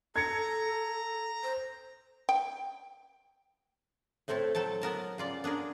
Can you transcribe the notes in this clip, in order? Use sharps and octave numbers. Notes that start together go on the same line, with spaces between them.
A4 A#5 G#6 C#7
C5
G5
A2 A3 C4 E4 A4
F#3 A4 G5 A5
F#3 B3 A#4 A5
C#3 F4 D5
B3 D4 G#4 A#4